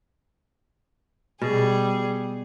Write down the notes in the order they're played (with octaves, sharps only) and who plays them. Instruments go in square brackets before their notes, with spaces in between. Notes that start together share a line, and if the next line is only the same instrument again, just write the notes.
[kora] B2 [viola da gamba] G3 G#4